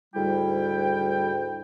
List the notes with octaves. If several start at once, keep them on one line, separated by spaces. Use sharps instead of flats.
D2 G#2 G3 E4 G5